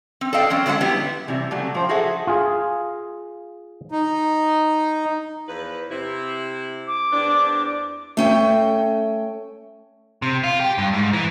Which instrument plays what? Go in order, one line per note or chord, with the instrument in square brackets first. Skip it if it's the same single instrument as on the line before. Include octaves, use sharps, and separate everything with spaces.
[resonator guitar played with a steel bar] C4
A4 D5 D#5 F5 G5
F#3 C4 C#4
D3 F#3 G#3 F5 F#5
G3 B3 E4 G4
C3 E3 F#3 G3
C#3 F#3 G3 A3
F3 C5 G5
F#4 G#4 A4 E5 F#5
[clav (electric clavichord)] F4 G#4
[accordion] D#4
[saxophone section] E2 F3 B4
C3 E4
[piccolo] D6
[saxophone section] E2 C4 D4
[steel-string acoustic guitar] A3 C#4 G5
[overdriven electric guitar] C3
F4
G4
G2
G#2
E3